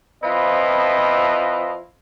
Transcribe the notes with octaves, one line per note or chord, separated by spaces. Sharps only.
F3 C4 E4 F4 B4 D#5